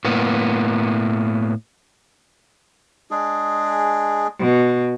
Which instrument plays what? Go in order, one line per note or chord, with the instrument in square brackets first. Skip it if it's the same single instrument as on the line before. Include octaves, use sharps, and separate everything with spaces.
[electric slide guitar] A2 A#3 B3
[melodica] G#3 D4 G#4
[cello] B2